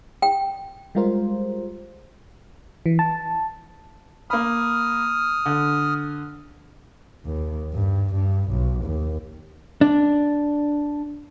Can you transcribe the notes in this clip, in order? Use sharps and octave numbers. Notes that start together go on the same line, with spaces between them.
G5
G3 G#3 F4 A#4 C5
E3
A5
A#3 B5 D#6 F6
D3
D#2
G2
G2
B1
D#2
D4